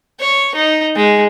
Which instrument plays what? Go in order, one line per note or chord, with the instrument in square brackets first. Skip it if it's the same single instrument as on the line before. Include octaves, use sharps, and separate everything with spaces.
[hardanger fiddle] C#5
D#4
G#3